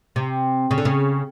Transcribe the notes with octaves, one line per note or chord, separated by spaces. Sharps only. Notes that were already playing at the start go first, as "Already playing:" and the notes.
C3
C#3
D3
C#3